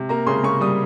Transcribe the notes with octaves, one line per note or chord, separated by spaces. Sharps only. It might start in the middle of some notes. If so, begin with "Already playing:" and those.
Already playing: C3
A#3 A#5
C#3 C6
C#3 C#6
G3 D#6